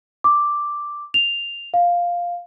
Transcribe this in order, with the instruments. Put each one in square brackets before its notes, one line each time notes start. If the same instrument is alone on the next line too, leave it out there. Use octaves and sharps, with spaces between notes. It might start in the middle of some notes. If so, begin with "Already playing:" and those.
[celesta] D6
F7
F5